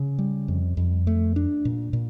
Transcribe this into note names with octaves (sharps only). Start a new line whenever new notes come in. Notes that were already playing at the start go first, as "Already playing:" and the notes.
Already playing: C#3
G3
F2
F2
A3
D4
A#2
A#2